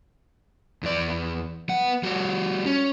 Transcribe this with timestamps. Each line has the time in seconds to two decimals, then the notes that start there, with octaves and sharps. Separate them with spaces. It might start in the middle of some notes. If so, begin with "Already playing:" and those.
0.83 E2 D5
1.69 B3 F#5
2.03 G3 F#4
2.66 C#4